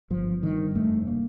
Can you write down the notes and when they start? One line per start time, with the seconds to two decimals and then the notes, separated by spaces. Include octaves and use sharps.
0.10 G1 F3
0.43 G2 D#3
0.75 F1 A3
1.07 A#3